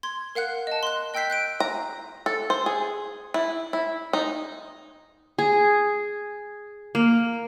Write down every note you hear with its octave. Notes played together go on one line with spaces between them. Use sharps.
C6 G#6
A#4 F5 F#5 F#6
D#5 A5
C6 F#6
D#5 G5 E6 G6 B6 C7
F#6 G6 D7
A#5
A4
C5
G#4
E4
E4
D#4
G#4
A#3